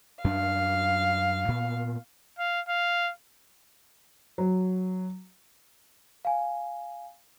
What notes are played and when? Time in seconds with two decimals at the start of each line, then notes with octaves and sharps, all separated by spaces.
0.24 F#2 D4 F5
1.48 A#2 B3
2.39 F5
2.69 F5
4.38 F#3
6.25 F5 G#5